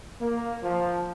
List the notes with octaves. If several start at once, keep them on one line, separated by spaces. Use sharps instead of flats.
A#3
F3